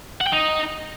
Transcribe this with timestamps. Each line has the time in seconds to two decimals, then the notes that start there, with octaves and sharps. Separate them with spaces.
0.21 F#5
0.27 G5
0.32 D#4